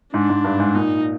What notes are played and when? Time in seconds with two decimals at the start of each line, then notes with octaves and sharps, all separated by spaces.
0.13 G#2 D4
0.29 G#2
0.44 G2
0.59 G#2
0.75 A#2 D#4